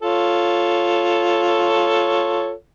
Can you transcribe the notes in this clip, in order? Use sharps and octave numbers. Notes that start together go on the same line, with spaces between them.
F4 A4 C#5